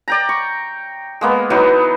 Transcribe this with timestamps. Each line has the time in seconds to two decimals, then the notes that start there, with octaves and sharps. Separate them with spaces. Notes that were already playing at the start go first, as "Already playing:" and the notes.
0.08 D5 G5 A#5
0.29 C#6
1.21 G#3 A#3 B3
1.50 E3 F#3 B3 D#4